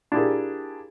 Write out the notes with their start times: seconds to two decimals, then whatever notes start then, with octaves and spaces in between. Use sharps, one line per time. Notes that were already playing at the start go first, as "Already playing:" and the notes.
0.12 D4 E4 F4 G4 G#4 A#4